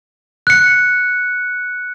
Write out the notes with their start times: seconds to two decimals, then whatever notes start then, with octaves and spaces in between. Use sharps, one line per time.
0.47 F#6 C#7